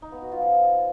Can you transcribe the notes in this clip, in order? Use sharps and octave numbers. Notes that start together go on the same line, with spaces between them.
D#4
B3
F#4
F4
F3